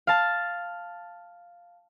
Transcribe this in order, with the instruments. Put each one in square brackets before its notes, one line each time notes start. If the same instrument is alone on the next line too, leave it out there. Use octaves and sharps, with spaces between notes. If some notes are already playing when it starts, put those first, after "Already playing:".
[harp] F5 A5